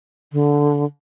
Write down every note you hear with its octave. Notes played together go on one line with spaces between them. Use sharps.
D3